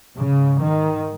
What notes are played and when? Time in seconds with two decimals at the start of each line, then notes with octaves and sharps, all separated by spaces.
0.16 G#2 C#3
0.59 D#3